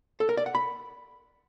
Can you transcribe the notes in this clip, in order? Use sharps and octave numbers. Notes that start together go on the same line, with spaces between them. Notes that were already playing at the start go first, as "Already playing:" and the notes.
A4
A#4
D5
F#5
B5